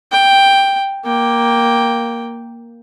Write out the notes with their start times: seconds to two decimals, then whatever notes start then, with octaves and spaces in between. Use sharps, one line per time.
0.12 G5
1.05 A#3 G5